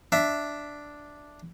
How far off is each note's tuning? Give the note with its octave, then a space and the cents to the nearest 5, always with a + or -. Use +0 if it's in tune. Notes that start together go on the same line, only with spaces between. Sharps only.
D4 +0 E5 +0